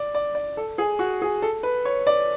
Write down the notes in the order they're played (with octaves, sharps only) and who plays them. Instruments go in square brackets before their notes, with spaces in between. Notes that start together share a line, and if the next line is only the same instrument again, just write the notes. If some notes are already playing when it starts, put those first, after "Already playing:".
Already playing: [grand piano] D5
D5
D5
A4
G#4
F#4
G#4
A4
B4
C#5
D5